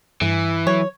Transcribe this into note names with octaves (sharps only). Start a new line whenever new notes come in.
G2 E3
F#3 C#5